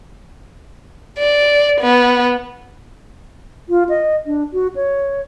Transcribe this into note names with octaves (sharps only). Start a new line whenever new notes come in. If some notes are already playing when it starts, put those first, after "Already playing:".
D5
B3
F4
D#5
D4
F#4
C#5